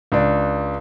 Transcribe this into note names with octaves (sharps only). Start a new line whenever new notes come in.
C#2 D4